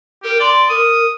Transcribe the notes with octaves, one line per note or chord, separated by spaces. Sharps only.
G4 A#4
D5 C6
A#4 D#6